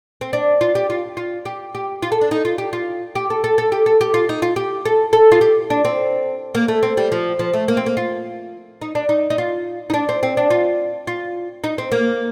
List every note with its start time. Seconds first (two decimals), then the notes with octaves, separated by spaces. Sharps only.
0.21 C4
0.33 D4
0.61 F4
0.75 G4
0.90 F4
1.17 F4
1.45 G4
1.75 G4
2.02 F4
2.12 A4
2.21 D4
2.31 D#4
2.45 F4
2.58 G4
2.73 F4
3.15 G4
3.30 A4
3.44 A4
3.58 A4
3.72 G4
3.86 A4
4.01 G4
4.14 F4
4.29 D#4
4.42 F4
4.56 G4
4.85 A4
5.13 A4
5.32 F4
5.41 G4
5.70 D4
5.85 C4
6.55 A#3
6.68 A3
6.83 C4
6.97 G3
7.12 F3
7.39 F3
7.53 A3
7.68 A#3
7.77 C4
7.86 A#3
7.97 F4
8.82 D#4
8.95 D4
9.09 D#4
9.30 D#4
9.38 F4
9.90 D#4
9.94 D4
10.09 C4
10.23 C4
10.37 D4
10.50 F4
11.07 F4
11.64 D#4
11.78 C4
11.92 A#3